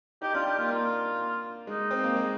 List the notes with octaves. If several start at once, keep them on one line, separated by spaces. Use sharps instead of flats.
D#4 G4
D4 F4
G4
A#3 F4
A#3 F4
G#3 D#4
C4
A#3
G#3